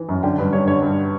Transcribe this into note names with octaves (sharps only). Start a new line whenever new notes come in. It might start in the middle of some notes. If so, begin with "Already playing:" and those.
Already playing: E3
F#2
D3 G5
G2 B4
G2 C#5
D3 C#5
G2